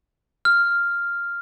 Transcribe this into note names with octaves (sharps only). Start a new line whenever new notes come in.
F6